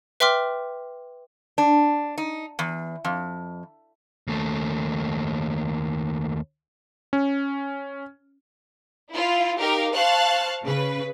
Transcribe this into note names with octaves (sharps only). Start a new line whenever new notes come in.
B4 E5 G5 C6 D6 F6
D4
D#4
E2
F2
D#2 A3
C#4
E4 F4
D#4 G4 A#4 F5
C5 F5 A5 C#6 F#6
C#3 B4